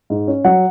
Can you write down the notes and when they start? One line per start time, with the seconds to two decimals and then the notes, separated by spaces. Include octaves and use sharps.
0.10 G#2
0.28 C#4
0.45 F#3 F#5